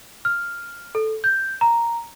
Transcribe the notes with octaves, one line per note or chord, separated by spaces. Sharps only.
F6
A4
G6
A#5